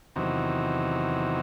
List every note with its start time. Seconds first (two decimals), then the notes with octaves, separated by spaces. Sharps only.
0.15 E2 C3 D#3 F#3